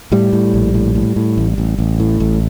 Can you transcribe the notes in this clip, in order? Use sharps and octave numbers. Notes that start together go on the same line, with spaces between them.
A2 G3
A2
A#1
A2
A2
A2
A1
A1
A1
A2
A1